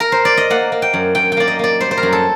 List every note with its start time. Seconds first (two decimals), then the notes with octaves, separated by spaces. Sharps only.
0.00 A#4
0.12 C5
0.25 D5
0.37 D#5
0.50 A#3 F#5
0.72 A#3
0.82 G5
0.94 F#2
1.15 F#2 G5
1.32 G5
1.37 A#3 D5
1.48 D#5
1.59 A#3 D5
1.80 G3 C5
1.91 C5
1.97 A#4
2.03 F#2
2.13 A4